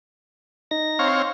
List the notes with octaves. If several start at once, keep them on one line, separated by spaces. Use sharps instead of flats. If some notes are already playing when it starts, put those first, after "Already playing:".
D#4 A#6
C4 C#5 F5